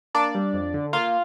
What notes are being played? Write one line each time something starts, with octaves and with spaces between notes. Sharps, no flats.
A#3 D4 D5
G3
F2
D3
A#3 F4 F5